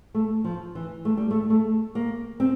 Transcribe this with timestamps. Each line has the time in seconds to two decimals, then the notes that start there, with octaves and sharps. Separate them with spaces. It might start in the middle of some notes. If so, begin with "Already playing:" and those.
0.14 A3
0.44 F3
0.75 E3
1.05 A3
1.17 G3
1.31 A3
1.50 A3
1.95 A#3
2.40 C4